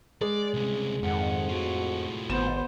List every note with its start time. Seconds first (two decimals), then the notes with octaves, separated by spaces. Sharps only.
0.21 G#3 D5
0.54 C2 C#3
1.03 F2 G#2 D#3 F#5
1.49 A2 F4 F#4
2.30 G#1 B3 C5 E7